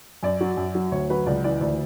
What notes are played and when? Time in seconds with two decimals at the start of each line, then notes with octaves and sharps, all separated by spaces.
0.23 F#2 D5
0.40 F#3
0.57 F#2
0.75 F#3
0.92 D2 C#5
1.10 F#3 B4
1.26 C#2 D5
1.44 E3 D5
1.61 D2 D5